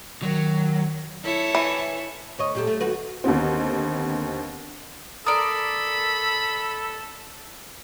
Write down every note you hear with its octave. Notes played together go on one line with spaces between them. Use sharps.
D#3 F#3
E4 A4 C#5
E3
D2 C#5 D#5
A#2 G4 A4
A3
D#2 F#4 B4
D#2 D3 B3 C4
A4 A#4 D5 B5 D#6